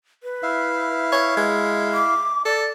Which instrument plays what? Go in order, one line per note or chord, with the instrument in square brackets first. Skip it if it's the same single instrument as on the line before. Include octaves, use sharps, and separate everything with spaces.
[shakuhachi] B4
[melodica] E4 E5 F5
[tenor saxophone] C#5
G#3
[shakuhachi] D6
[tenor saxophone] A4 [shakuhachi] D5